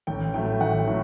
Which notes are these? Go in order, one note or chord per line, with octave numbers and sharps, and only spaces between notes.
A1 G5
A2 F#3 A3 G5
A1 F#5
A2 F#3 A3